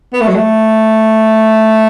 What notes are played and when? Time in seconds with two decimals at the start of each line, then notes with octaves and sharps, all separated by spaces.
0.13 B3
0.20 A3
0.28 F#3
0.35 A3